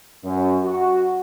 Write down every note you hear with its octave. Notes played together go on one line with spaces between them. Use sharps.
F#2
F#4